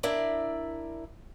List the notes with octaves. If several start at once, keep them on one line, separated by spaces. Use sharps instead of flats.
D4 E4 A#4 D5 E5